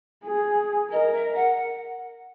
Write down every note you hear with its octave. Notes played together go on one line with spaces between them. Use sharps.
G#4
A#4 D#5
E5
F#5